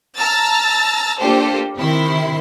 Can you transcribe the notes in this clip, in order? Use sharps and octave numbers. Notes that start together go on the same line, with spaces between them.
A5 A#5 E6 F6 A6
A#3 D4 F4 G4 A4 C5
C3 D#3 E4 C6